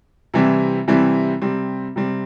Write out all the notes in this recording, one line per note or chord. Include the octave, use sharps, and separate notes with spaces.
C3 E3 G3 C4 E4
C3 E3 G3 C4 E4
C3 G3 C4
C3 G3 C4